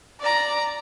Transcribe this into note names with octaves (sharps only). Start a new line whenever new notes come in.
D5 A#5